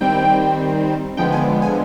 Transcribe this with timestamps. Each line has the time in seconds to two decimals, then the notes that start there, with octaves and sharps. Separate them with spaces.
0.01 D#3 G3 C4 G5
1.17 D3 F3 G#3 B3 G5
1.32 G#5
1.62 G#5